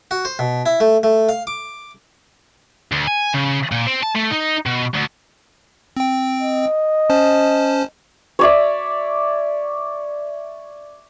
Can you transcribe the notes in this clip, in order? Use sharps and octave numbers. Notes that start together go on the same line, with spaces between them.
F#4
C5
B2
E4
A3
A3
F5
D6
D2
G#5
C#3
A#2
C4
A5
A3
D#4
B2
D2
C4 G5
D#5
C#4 C5 A5
C#5 D5 E5